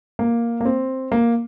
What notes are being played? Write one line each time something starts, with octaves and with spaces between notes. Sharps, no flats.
A#3
A#3
C4
A#3